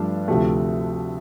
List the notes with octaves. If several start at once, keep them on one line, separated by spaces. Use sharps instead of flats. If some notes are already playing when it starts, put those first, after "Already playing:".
Already playing: G2 F3 A3 D4
D2 C3 F3 A3